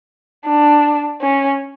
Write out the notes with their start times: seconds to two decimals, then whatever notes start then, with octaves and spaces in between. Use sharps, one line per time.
0.45 D4
1.21 C#4